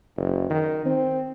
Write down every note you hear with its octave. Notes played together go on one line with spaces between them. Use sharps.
F#1
D#3
C4